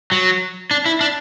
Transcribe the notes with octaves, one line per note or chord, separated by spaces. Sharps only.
F#3
D4
E4
D4